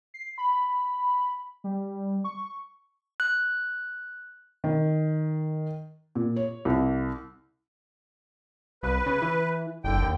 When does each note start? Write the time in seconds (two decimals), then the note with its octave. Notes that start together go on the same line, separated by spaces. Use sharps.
0.14 C7
0.38 B5
1.64 G3
2.24 C#6
3.20 F#6
4.64 D#3
6.15 A#2
6.36 C#5
6.65 C2
8.83 C2 B4
9.06 C#3
9.22 E3
9.84 F#1 D3 G5
10.02 D#2